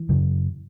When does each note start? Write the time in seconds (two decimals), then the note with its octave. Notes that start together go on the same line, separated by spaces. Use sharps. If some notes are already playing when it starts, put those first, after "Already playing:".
Already playing: E3
0.09 F#2 C#3